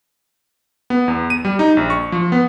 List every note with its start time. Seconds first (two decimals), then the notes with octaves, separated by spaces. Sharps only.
0.90 B3
1.08 E2
1.30 D#7
1.45 G3
1.59 D#4
1.77 A#1
1.90 C#6
2.12 F3
2.32 B3